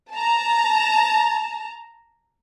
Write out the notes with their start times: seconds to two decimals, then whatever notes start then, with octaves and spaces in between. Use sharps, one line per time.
0.13 A5 A#5